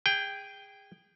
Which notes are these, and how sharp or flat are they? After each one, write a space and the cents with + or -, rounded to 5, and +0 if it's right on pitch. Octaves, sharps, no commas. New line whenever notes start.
G#4 -20 G5 +0